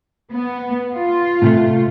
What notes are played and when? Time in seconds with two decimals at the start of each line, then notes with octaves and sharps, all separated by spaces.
0.30 B3
0.95 F4
1.42 A2 C3 A3